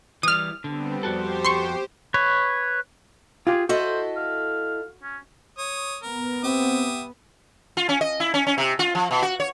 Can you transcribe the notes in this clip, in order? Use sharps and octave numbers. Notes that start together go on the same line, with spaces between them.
E3 G3 D#6 F6
D3 G3 B3 C4
F2 F#4 G4 A4 C5
C6 C#6
B4 C#5
F4 G4 G#4
E4 F#4 A4 C5 D#5
F5
C#4
C#5 D#6
B3 A#4
C4 G4 E5 D#6
F4
C#4
D#5
E4
C#4
C#4
C3
F4
F3
B2
F#4
C#5